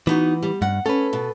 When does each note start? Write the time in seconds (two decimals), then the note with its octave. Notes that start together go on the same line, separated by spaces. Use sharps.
0.07 E3 B3 D#4 F#4
0.43 G3
0.62 G2 F#5
0.86 C#4 A4 B4
1.13 B2